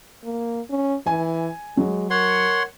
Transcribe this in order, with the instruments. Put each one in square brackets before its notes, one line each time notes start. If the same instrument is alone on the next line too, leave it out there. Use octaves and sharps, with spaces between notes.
[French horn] A#3
C#4
[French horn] E3 [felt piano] G#5
[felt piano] F#3 [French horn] G#3
[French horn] A#4 [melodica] C#5 F#5 C6